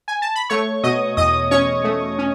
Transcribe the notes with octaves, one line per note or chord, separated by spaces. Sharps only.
G#5
A5
B5
A3 C#5 C#6
B2 D#5 D#6
E2 D#5 D#6
C#4 C#5 C#6
A3
C#4